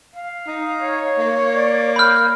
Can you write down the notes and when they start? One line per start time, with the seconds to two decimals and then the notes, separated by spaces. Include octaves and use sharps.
0.14 F5
0.47 D#4
0.83 C#5
1.18 A#3
1.54 D5
1.96 B5 F6 G6